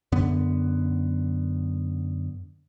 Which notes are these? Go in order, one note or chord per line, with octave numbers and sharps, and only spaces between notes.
F#2 D3 B3